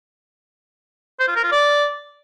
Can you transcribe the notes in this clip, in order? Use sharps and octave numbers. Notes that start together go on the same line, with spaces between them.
C5
F4
A#4
F4
D5